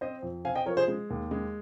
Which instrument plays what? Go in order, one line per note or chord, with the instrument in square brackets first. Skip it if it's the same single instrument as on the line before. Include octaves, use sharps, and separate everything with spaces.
[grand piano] C4 C5 D#5
F2
C4 F5 G#5
D#5 G5
F3 A#4 C#5
G#4 C5
G#3
D#2
G#3